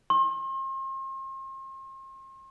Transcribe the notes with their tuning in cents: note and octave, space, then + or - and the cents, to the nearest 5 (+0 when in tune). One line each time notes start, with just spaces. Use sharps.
C6 +40